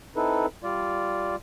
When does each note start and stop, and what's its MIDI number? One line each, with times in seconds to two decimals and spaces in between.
0.16 0.46 60
0.16 0.46 63
0.16 0.46 64
0.16 0.46 69
0.16 0.46 71
0.64 1.36 55
0.64 1.36 65
0.64 1.36 74